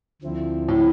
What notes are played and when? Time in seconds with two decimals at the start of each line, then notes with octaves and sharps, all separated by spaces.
0.22 D2 D3 F3 C4 E4
0.68 A2